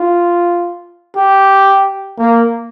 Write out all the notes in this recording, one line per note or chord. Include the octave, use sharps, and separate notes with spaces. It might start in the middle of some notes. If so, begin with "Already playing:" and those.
Already playing: F4
G4
A#3